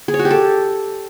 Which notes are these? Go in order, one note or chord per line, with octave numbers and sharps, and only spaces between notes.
G#4
C#5
F#4
G4
A4